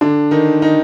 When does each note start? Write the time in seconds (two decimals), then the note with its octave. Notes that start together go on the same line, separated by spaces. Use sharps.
0.01 D3 D4
0.31 D#3 D#4
0.62 D#3 D#4